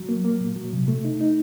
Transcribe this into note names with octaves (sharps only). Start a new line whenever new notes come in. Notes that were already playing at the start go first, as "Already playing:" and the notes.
Already playing: F#3
A#3
A#3
A#2
F#3
C3
A3
D#4
D#4